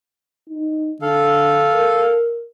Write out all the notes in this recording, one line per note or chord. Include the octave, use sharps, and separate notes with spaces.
D#4
D3 A4 F5
A#4